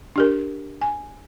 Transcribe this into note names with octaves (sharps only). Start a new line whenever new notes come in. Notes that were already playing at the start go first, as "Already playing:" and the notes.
D4 G4 A#4
G#5